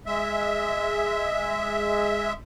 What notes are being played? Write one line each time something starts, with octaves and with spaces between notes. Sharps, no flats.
G#3 E5